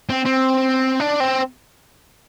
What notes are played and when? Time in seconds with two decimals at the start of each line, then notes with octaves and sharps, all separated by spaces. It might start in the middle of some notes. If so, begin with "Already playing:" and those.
0.09 C4
0.25 C4
1.00 D4
1.20 C4